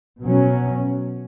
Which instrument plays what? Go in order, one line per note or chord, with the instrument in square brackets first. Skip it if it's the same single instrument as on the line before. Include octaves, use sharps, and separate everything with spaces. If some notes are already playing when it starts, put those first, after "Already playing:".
[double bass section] B2 F#3 C#4